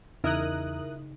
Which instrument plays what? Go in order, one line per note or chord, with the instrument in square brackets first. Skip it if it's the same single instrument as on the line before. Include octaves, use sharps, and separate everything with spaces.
[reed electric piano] E2 [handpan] C#3 D#4 [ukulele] E4 [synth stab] A#4 D#6 F#6